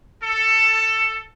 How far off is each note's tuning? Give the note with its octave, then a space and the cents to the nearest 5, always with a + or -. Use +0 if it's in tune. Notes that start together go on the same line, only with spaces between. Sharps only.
A4 +15